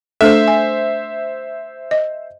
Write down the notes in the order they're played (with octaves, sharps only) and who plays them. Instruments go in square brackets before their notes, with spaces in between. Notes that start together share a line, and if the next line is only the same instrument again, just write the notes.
[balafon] A3 D4 A4 [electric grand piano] C5 E5
[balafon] G#5
D#5